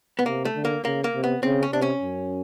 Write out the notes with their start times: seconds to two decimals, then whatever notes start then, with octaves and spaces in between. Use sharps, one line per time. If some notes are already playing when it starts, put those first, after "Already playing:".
0.19 B3
0.26 C3 A#3
0.45 A3
0.55 D3
0.65 A#3
0.84 C#3 A#3
1.04 A#3
1.14 C3
1.24 B3
1.43 C#3 C4
1.63 C#4
1.72 C3 D4
1.82 C#4
2.02 F#2